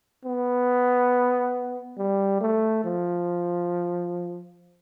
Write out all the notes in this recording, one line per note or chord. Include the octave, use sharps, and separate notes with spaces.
B3
G3
A3
F3